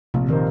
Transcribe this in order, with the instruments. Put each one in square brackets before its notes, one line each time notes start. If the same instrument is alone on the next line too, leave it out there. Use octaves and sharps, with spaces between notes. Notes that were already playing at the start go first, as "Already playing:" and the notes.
[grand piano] A#1 [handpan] C3
[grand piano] A#2 A#3 D#4 C5 [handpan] D#3